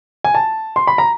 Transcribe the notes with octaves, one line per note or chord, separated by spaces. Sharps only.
G#5
A5
C6
B5
A#5